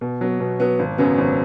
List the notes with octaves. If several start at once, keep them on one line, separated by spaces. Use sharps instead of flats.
B2
F#3 B3
B2
F#3 B3
G#1
F#2 C#3 F#3 B3
G#1